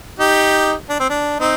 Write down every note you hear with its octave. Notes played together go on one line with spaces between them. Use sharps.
D#4 G4
D4
C4
D4
C4 D#4